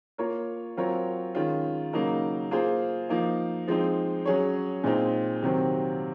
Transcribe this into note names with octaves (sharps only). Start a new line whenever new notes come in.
A#3 F4 A#4 C#5
F#3 C4 F4 A#4 C#5
D#3 G#3 C#4 F4
C#3 F#3 A#3 D#4 A#4
A#3 F4 G#4 C5
F3 A#3 D#4
F3 G#3 C4 D#4
F#3 C#4 G#4 C#5
A#2 G#3 C4 D#4
C3 D#3 F#3 C4